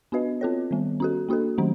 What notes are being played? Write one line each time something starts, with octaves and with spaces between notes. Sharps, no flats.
B3 D4 F#4 B4 D#5
C4 F4 A4 C#5
D#3 G3 B3
C#4 F#4 A4
A#3 D4 F#4 A4
D#3 F#3 A3 C#4